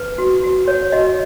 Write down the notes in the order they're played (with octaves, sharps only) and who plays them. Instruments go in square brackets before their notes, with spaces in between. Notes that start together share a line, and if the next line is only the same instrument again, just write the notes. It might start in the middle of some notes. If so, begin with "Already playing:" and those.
Already playing: [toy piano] B4
F#4
F#4
C#5
F#4 D#5